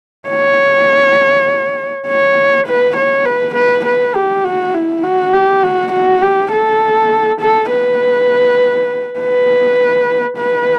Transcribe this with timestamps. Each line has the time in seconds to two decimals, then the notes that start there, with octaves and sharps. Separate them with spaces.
0.29 C#5
2.07 C#5
2.67 B4
2.97 C#5
3.25 B4
3.55 B4
3.85 B4
4.15 G4
4.44 F#4
4.74 E4
5.04 F#4
5.33 G4
5.63 F#4
5.92 F#4
6.22 G4
6.52 A4
7.41 A4
7.70 B4
9.19 B4
10.38 B4